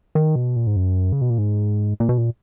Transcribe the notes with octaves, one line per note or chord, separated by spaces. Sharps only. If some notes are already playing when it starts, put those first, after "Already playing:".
D#3
B2
A#2
G#2
F#2
C#3
B2
A#2
G#2
A#2
B2
A#2